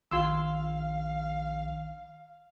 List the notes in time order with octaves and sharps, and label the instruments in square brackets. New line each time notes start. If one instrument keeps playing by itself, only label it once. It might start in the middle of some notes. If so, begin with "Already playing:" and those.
[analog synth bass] A#1 [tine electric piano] D#3 [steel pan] F4 C6 E6 [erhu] F5